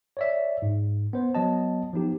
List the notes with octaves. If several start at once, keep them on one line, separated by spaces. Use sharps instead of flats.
C#5 D5 E5
G#2
B3 C5
F#3 B3 D#5 A5
F3 B3 D#4 G4